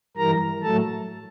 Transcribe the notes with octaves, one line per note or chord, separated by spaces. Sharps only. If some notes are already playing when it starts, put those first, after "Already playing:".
G2 E3 G3 A#4 A#5
A2 F#3 A3 A4 A5